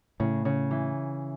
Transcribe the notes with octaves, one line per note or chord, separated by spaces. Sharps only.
A2 C#3
C#3
E3